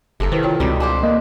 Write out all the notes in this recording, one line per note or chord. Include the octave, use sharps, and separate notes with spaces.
F#1 C3 A4 A#4
D#3 E4 B4 C5
F4 C#5 G5
C#2 B2 G3 C4
D4 G4 C5 G#5
A#3 D#5